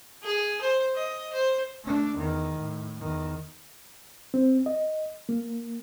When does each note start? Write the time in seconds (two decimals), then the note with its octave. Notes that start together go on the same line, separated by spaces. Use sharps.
0.23 G#4
0.61 C5
0.96 D#5
1.33 C5
1.84 A3 D4
2.18 E2 D#3
2.59 A2
3.00 E2 D#3
4.34 C4
4.66 D#5
5.29 A#3